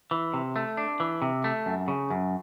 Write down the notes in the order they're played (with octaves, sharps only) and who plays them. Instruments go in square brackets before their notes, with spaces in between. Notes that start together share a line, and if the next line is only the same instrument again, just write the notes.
[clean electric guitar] E3
C3
A3
D4
E3
C3
A3
F#2
C#3
F#2